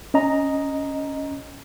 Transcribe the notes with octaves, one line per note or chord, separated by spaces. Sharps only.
C#4 D#5 A#5